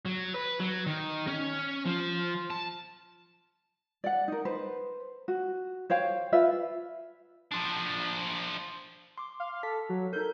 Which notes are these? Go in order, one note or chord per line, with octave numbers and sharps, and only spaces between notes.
F#3
B4
F#3
D#3
C#4
F3
A5
D5 F#5
D#4 A#4
B4 C5
F#4
C5 C#5 F5 G5
F4 B4 E5 F5
F3 D4
C6 D6
F5
A4 B6
F#3
D#4 A4 A#4 G6